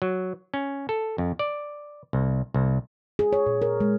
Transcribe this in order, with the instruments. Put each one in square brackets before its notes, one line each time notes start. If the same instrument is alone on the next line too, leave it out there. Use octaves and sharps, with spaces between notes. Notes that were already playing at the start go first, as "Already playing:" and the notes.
[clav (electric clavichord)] F#3
C#4
A4
F2
D5
C2
C2
[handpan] G#4
C#5
A#2
A#4
G#3